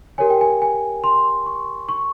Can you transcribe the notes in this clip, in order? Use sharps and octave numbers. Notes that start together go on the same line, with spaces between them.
G4 A#4 C#5 G#5
G5
G#5
G#5
C6
C#6
C#6